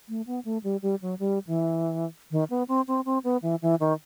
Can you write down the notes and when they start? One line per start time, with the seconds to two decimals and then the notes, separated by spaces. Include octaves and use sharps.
0.09 A3
0.27 B3
0.45 A3
0.64 G3
0.82 G3
1.02 F#3
1.19 G3
1.47 E3
2.31 D#3
2.50 B3
2.68 C4
2.88 C4
3.05 C4
3.24 B3
3.42 E3
3.62 E3
3.80 D#3